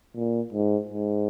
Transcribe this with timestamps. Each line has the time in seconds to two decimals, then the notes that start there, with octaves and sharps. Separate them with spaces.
0.16 A#2
0.53 G#2
0.89 G#2